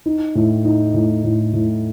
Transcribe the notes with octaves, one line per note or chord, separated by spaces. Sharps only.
D#4
A2
D#4
A2
A2
A2